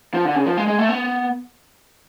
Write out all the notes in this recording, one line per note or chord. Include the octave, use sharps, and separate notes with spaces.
F3
D3
C#3
F3
G#3
G#3
A3
B3